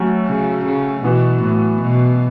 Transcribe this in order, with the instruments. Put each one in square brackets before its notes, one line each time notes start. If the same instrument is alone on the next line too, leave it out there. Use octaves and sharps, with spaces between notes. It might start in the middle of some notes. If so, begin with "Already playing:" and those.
Already playing: [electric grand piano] F#3 A3 C#4 F#4
[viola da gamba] C#3
C#3
[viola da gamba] B2 [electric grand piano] E3 B3 F#4
[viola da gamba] A2
B2